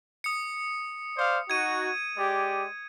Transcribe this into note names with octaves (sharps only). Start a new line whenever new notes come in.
D#6 C#7
C5 D5 F5
D#4 F#4 G#6 D#7
G#3 G4 D5